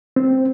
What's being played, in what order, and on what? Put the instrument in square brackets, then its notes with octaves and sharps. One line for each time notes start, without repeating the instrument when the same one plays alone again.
[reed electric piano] C4